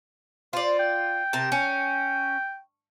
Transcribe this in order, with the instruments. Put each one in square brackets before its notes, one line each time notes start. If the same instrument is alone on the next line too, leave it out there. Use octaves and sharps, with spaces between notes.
[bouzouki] F4 D5 [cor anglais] C5
[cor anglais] G5
[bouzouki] C3 A#4 A5
C#4